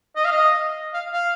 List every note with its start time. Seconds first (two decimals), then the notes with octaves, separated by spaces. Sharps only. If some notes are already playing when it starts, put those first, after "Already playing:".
0.16 D#5
0.25 F5
0.32 D#5
0.94 F5
1.13 F5